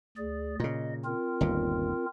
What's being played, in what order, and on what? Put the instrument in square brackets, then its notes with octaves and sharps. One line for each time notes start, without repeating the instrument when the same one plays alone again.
[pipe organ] D2 G#4 D5
[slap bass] A#2 C#3 [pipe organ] D#5
[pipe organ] C4 F4 A#4
[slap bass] G1 D#2 A#2